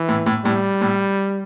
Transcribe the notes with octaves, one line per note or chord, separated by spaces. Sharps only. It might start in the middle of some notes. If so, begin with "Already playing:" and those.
Already playing: E3
A2
A2
A2 G3
A2